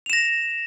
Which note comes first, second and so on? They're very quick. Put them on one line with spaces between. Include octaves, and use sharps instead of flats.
F7 E7 A#6